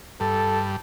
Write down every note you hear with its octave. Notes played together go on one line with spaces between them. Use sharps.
G2 A4